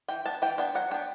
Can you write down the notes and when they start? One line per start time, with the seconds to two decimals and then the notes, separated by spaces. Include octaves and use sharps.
0.08 E3 G5
0.26 B3 D4 A5
0.42 E3 G5
0.58 B3 D4 G5
0.75 F#3 F#5
0.91 B3 D4 G5